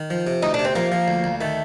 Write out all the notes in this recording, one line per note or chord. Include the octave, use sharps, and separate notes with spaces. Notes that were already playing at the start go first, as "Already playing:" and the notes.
Already playing: D#3
F3
C3
D2 D#4
D4
C3
C4
F3 A#3
F3
D2
D2
D#3 A3